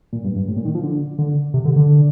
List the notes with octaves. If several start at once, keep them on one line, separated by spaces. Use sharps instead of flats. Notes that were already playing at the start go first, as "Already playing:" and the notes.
A#2
G2
G2
A2
A#2
D#3
F3
D3
D3
C3
D3
D3